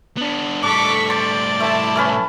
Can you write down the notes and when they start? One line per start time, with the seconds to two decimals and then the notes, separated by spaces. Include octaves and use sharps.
0.17 B3 D4
0.63 A2 G3 D4 A4 C#6 D6 B6
1.10 C5 D5 A5
1.60 A3 E4 A5
1.96 A3 C#4 B4